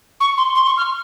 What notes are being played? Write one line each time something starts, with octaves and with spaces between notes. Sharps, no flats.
C#6
C6
C6
C#6
F6